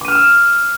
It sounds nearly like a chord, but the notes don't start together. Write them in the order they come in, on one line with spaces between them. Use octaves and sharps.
D6 D#7 F6 E7 E6